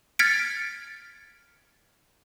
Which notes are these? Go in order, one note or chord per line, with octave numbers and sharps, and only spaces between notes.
F6 G#6 A6 B6 C#7 D7